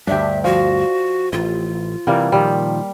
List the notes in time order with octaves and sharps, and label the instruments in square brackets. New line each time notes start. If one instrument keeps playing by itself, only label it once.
[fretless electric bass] D2 G2 [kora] D4 G4 [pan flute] E5
[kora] F3 [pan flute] F#4
[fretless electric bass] A1 [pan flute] F4
[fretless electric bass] C3 E3 [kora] G3 A#3
[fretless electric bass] A#2 D#3 F3 [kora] G3